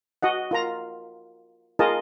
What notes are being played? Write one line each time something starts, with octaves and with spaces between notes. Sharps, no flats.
F#4 D#5 F#5
F4 A#4 A#5
F4 G#4 A#4 D#5 A5